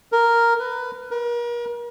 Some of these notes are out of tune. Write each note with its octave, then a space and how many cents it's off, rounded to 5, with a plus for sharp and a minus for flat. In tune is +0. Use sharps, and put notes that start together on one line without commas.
A#4 +0
B4 +15
A#4 +40